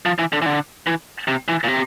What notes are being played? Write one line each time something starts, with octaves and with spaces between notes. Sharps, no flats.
F3
E3
D3
E3
D3
E3
C3
E3
A#2
C3